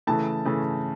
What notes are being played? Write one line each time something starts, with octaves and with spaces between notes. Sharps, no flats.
C#3 E3 A3 A5
C#3 E3 A3